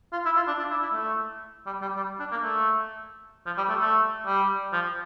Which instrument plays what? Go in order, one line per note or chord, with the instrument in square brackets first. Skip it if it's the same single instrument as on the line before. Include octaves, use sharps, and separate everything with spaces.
[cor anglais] F4
E4
F4
D4
D4
E4
E4
A3
G3
G3
G3
D4
A#3
A3
F3
G3
A3
A3
G3
F3